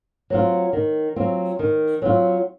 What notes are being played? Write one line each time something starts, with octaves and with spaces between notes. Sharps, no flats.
F#3 C4 F4
D#3
F#3 C4 F4
D#3
F#3 C4 F4